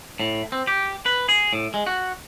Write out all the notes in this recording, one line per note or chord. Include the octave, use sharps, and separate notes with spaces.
A2
C4
G4
B4
G#4
A2
G#3
F#4